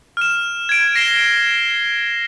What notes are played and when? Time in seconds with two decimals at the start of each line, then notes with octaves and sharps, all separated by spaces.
0.17 F6 E7
0.69 G#6 D7
0.95 A#6 C7 D7 E7 G7